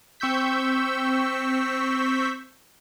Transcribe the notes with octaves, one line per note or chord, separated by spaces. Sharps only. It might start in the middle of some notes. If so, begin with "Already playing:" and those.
C4 C#6 E6 G6 B6